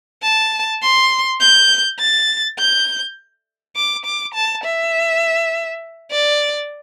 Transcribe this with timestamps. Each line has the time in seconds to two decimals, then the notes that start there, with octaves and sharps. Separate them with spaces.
0.23 A5
0.82 C6
1.40 G6
2.00 A6
2.58 G6
3.76 D6
4.05 D6
4.35 A5
4.64 E5
6.11 D5